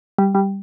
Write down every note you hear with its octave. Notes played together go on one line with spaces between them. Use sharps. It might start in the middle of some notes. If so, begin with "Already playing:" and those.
G3
G3